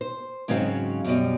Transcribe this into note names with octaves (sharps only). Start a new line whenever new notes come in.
C5
G#2 C#3 F#3 G#3 C4 F5
F#2 B2 G3